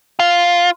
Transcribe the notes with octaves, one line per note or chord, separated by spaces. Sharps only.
F4